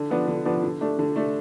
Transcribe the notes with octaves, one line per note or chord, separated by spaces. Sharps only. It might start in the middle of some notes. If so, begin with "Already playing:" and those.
Already playing: D3
F3 B3 D4
D3
F3 B3 D4
D3
A3 D4
D3
A3 D4